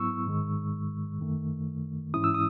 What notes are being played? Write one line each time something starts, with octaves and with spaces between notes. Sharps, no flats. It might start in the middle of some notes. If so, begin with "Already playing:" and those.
Already playing: G#2 F#3 B3 E4 C#6 E6
G#2 D#3 G#3
F#2 D#3 A3
G#2 E3 G#3 C#4 E4 D#6
E6
D#6